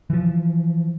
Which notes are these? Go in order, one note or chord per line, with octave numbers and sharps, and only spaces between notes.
E3 F3